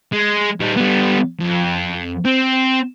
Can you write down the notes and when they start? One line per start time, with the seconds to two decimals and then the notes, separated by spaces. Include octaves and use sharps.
0.12 G#3
0.60 G3 D#4
0.76 G3 B3
1.40 F2
2.25 C4